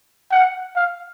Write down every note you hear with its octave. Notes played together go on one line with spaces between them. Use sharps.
F#5
F5